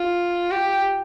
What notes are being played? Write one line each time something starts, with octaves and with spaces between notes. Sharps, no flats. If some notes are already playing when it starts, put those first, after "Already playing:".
Already playing: F4
G4